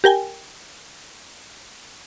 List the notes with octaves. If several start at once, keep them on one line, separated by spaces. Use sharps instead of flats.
G4 A#4 G5 G#5